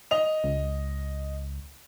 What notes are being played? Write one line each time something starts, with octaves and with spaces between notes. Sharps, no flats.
D#5 F7
C#2